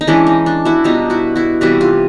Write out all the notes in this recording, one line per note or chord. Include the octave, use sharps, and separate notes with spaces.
D#4
E3 G#3 C#4 D4 E4
D#4
D4
E4 F#4
B2 G3 B3 D4 D#4 F4
E4 F#4
E4 F#4
C3 E3 G3 B3 E4 F#4
F4 G4